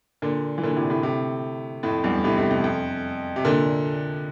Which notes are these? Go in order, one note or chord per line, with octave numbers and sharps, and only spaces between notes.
A#2 D3
E3
A#2 D3
A2 C3
A2 C3
A2 C3
F2 A2
E2 G2
A2 C3
A2 C3
F2
F2
C3
A#2 D3